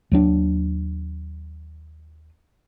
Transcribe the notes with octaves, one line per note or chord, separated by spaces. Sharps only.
D#2 F#3 D4